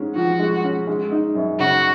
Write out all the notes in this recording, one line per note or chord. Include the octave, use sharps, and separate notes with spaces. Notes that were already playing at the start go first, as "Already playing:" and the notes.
Already playing: G#2 G#3 C#4
F3 F#4
G#3
C#4
G#3
D#4
F#2
C#3 F#4